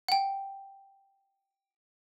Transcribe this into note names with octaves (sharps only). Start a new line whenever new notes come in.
F#5 G5